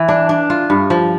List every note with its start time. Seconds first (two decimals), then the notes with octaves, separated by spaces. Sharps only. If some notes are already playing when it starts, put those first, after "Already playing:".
Already playing: E3
0.08 D4
0.29 D4
0.50 F4
0.70 G2
0.90 F3